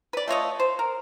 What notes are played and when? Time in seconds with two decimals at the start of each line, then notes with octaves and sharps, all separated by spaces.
0.13 B4 D5
0.28 A3 F4 C#5 D#5
0.59 C5
0.79 A#4